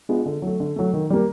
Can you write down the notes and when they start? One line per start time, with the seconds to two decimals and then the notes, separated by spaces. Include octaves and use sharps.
0.09 G#3 B3 D4 F4
0.26 D3
0.42 F#3 A3
0.60 D3
0.76 F#3 A3
0.93 D#3
1.10 G3 A#3